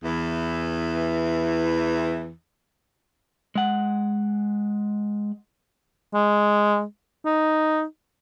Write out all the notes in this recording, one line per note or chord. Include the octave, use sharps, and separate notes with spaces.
E2 E3
G#3 F#5
G#3
D#4